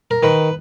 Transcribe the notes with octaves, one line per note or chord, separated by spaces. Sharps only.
A#4
D#3 B4